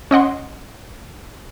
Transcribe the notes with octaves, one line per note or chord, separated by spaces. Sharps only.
C#4 D#5 F#5 C6